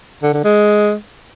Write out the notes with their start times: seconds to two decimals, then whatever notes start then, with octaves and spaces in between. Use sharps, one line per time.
0.23 D3
0.34 D3
0.44 G#3